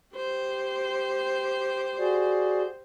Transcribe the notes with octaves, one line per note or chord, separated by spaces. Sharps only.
G4 C5
F#4 G#4 D5